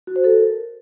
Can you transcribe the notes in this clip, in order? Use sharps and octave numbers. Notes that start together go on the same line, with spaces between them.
F#4
C5
A4
A#4